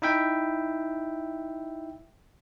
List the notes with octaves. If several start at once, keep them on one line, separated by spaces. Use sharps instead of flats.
D#4 E4 E5 G5